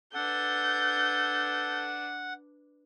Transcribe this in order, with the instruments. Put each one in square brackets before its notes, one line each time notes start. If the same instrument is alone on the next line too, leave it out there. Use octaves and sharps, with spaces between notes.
[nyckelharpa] D4 B4 [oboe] A4 [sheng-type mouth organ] F#5 [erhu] G6